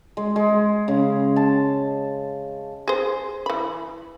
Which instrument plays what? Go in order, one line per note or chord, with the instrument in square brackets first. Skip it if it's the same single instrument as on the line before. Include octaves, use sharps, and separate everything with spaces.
[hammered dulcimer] G#3
G#3
C#3
A5
[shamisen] G#4 C5
E3 B5